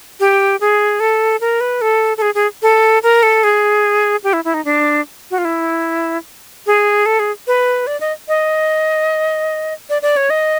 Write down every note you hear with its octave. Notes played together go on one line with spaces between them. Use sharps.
G4
G#4
A4
A#4
B4
A4
A4
G#4
G#4
A4
A#4
A4
G#4
G4
E4
E4
D#4
D4
F#4
F4
E4
G#4
A4
G#4
B4
D5
D#5
D#5
D5
D5
C#5
D#5